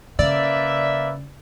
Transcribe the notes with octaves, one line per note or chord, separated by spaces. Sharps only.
C#3 A#3 B4 D5 E5 E6